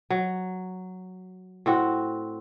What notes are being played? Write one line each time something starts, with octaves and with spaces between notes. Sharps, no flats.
F#3
A2 C4 F#4